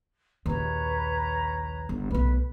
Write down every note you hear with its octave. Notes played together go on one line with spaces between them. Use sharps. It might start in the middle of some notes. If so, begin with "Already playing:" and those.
A#1 D#2 B4 C#5 A#5
G1
B1 A3 B4 B5